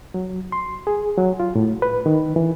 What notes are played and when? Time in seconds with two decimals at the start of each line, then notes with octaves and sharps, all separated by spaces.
0.14 F#3
0.52 C6
0.87 G#4
1.18 F#3
1.40 F4
1.56 A2
1.82 B4
2.06 D#3
2.36 E3